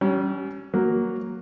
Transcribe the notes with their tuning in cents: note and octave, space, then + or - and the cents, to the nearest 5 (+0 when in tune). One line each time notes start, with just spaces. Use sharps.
G3 -40 C#4 +10
F#3 +0 A#3 +0